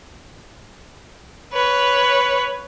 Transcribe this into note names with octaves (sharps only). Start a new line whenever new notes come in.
B4 C#5